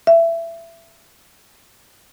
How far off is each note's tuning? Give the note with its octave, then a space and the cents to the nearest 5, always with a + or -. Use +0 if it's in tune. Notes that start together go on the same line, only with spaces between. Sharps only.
E5 +20